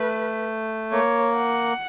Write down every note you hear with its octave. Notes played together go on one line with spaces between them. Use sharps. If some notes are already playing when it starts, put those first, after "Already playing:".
Already playing: A3 B4
A#3 C#5
F#5